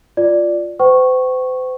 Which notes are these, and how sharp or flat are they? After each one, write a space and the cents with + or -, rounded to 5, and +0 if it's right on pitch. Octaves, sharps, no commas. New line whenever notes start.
F4 +0 D5 +0
C5 -40 G5 -40 C#6 -10